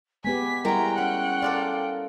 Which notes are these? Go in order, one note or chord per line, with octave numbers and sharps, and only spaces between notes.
G#3 B3 G4 G#5 B6
G3 G#3 E4 F#4 A#4 G5 A#5
C#4 F#5
F4 A4 A#4 D5